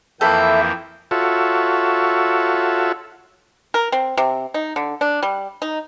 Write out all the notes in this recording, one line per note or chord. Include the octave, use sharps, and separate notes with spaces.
F2 E3 A#3 A4 B4 E5 G5
F4 F#4 A4 C#5 E5
A#4
C4
C3
D#4
D3
D4
G3
D#4